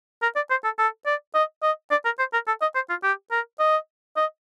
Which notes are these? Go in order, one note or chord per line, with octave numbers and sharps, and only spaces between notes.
A#4
D5
C5
A4
A4
D5
D#5
D#5
D5
A#4
C5
A#4
A4
D#5
C5
F4
G4
A#4
D#5
D#5